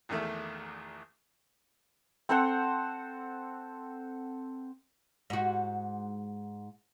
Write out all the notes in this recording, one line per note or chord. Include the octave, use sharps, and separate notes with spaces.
A#1 E2 D#3 A3 E5
C4 A4 C5 F#5
G#2 F#4